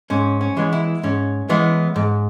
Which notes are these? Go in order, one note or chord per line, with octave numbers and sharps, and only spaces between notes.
G#2 C#4
C#4
E3 G#3 B3
E4
G#2 C#4
E3 G#3 B3
G#2